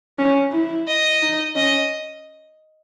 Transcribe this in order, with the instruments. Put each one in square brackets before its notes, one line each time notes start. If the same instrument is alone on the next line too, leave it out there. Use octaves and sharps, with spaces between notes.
[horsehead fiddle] C#4
E4
[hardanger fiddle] D#5
[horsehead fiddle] D#4
[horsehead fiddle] C#4 [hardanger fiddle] D#5